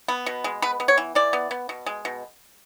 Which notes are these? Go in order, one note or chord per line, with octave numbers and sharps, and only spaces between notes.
B3
B2
G#3
B3 B4
B3
C#5
E3
E3 D5
B3
B3
B2
G#3
B2